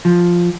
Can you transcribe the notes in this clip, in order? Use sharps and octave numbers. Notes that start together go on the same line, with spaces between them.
F3